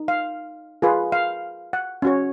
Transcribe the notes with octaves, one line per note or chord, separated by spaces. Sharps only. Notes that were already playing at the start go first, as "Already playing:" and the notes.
Already playing: D#4
F5
F4 G#4 B4
F5
F#5
C#4 F#4 C#5